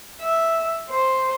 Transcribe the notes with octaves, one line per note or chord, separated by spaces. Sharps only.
E5
C5